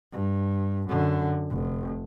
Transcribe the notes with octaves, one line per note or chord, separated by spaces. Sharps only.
G2
F#2 D3
F1